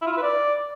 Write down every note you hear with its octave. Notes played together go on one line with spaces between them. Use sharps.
E4
F4
E4
B4
D5